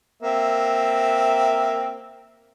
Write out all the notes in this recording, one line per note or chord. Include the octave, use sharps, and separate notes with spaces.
A#3 C4 E5